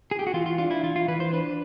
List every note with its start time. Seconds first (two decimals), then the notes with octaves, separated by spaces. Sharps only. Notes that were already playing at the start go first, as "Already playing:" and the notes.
0.11 G#4
0.19 G4
0.27 F#4
0.33 E3 F4
0.46 F4
0.58 D4 F4
0.71 E4
0.83 E3 F4
0.96 F4
1.08 E3 B4
1.20 C5
1.33 D4 B4